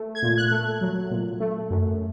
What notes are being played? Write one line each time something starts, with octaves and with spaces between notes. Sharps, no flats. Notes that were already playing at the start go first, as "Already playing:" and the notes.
Already playing: A3
G#6
A#2
F#6
A3
F#3
A#2
A3
F#2